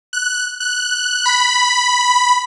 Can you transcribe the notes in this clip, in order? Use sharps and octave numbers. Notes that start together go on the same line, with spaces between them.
F#6
F#6
B5